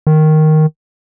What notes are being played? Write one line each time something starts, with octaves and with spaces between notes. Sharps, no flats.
D#3